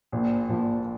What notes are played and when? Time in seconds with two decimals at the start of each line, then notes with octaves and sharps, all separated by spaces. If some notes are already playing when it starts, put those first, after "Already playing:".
0.12 A#1 A#2 F3
0.49 A#1 A#2 F3